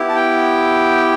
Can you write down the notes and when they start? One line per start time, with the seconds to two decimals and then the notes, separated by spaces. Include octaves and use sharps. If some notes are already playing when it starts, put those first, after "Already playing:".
Already playing: B3 E4 G4
0.09 A5
0.16 G5